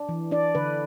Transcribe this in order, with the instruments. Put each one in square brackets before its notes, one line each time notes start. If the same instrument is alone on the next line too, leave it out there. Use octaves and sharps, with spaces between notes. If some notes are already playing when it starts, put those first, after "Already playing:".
Already playing: [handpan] D4
E3
D4 D5
D3 B4